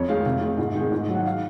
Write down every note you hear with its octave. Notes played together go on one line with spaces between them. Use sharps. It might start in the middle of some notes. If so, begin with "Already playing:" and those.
Already playing: F2 C#5
D#3 G#3 F5
C3 F5
D#3 G#3
G#2
D#3 G#3
G#2
F#3
F#5
F5